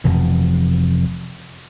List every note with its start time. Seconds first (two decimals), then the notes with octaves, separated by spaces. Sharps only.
0.04 F1 F2 B2 E3